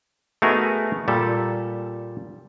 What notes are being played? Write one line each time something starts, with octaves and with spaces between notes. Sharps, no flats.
A3 B3 D#4 F#4 G#4 A#4
A#2 G3 A4